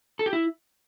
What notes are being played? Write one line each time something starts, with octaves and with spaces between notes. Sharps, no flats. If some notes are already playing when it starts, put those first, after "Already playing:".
A4
G4
E4